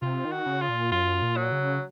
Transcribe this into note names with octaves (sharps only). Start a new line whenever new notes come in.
C3 F4
D#3
F#4
C#3
F4
A#2
F#2 F4
A#2
F#3
C#3